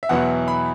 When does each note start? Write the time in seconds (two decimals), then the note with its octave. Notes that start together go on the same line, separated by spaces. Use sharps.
0.03 E5
0.09 E2 B2 F#3 B3 E4 F#5
0.48 B5